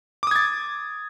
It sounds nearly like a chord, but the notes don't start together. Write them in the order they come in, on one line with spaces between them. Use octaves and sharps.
D6 D#6 G#6 A6